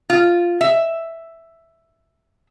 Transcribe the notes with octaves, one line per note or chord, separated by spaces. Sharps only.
F4
E5